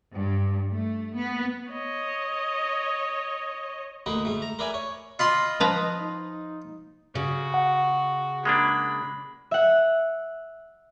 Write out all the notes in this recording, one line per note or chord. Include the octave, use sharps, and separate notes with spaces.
G2
A3
B3
C#5 D#5
D2 A#3 B4 D#5
G#2 A3
A#5
A#4 B4 D5 E5 G#5
C#5
F4 D#5 B5 C6
F3 B4 A#5
D#4
C#3 F#4
F#5
G#3 A#3 D4 B5
E5 F#5